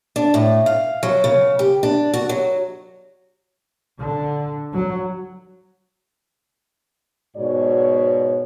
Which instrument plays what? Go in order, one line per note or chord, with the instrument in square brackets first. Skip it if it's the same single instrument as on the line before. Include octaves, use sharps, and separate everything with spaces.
[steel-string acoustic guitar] D4
A2
F5
F#3
C#3
G4
D4
F#4
F#3
[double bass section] D3
F#3
[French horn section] G#2 B2 F#4 C#5 D5